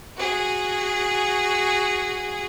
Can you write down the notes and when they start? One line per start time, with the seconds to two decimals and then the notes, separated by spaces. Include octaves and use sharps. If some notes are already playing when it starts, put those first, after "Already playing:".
0.17 F#4 G#4